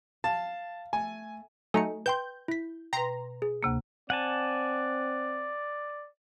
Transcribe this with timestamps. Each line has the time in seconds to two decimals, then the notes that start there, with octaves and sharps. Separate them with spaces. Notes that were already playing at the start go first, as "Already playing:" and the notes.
0.24 F5 A5
0.93 A3 G#5
1.74 F#3 A3 D#4 G#5 A#5 C#7
2.06 B4 G5 C6 G6
2.48 E4 B6
2.93 B2 B4 G5 A#5 C6
3.42 G#4
3.63 D2 C3 A#3
4.10 C4 D5 F#5 G#5 A5